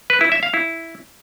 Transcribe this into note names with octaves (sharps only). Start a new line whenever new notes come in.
B4
E4
E5
F5
E4